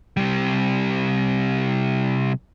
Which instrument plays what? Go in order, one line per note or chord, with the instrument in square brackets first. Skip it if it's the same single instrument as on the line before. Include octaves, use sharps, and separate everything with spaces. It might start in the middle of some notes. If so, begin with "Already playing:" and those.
[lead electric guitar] C3 G3